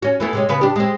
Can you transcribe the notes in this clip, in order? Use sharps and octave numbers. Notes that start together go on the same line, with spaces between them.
C#4 F#4
E3 A3 B3
C3 G#3 C#4
C#3 B3 B4
D4 G4
G#3 C4